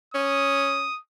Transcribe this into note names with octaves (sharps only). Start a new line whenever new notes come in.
C#4 D#6